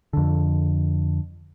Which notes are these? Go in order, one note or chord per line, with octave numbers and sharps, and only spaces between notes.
F2 D3